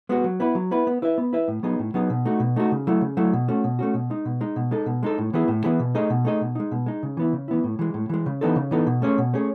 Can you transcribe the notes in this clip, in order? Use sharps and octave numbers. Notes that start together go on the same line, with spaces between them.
G#3 B3 F#4
F#3
B3 E4 B4
F#3
B3 E4 B4
B3
E4 B4 E5
B3
E4 B4 E5
A2
F#3 B3 D#4 G#4
A2
F#3 B3 D#4 G#4
B2
A3 D#4 F#4
B2
A3 D#4 F#4
C#3
F#3 A3 E4
C#3
F#3 A3 E4
B2
A3 C#4 F#4
B2
A3 C#4 F#4
B2
G#3 D#4
B2
G#3 D#4
B2
G#3 D#4 A4
B2
G#3 D#4 A4
A2
E3 B3 E4 G#4
A2
E3 B3 E4 G#4
B2
A3 D#4 G#4 D#5
B2
A3 D#4 G#4 D#5
B2
G#3 D#4
B2
G#3 D#4
C#3
E3 B3 E4
C#3
E3 B3 E4
A2
E3 G#3
A2
E3 G#3
C#3
E3 B3 D#4 A4
C#3
E3 B3 D#4 A4
B2
A3 C#4 G#4 C#5
B2
A3 C#4 G#4 C#5